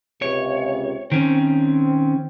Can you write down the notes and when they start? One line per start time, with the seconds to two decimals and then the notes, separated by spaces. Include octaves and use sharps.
0.22 C#2 C3 C#5
1.12 D#3 C4 C#4